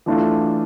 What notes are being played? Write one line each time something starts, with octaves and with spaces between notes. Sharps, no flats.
E3 A3 D4 F4